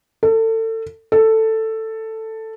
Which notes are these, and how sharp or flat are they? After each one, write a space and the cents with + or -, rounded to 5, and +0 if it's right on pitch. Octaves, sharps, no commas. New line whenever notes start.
A4 +30
A4 +10